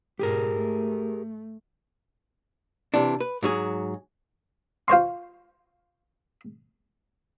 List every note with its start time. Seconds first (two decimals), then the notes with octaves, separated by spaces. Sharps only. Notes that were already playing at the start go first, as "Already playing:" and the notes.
0.19 G#2 B2 G4 G#4 A#4
0.55 A3
2.94 C3 E3 D4
3.20 B4
3.43 G#2 F#3 G#4
4.88 F4 C5 C#5 C6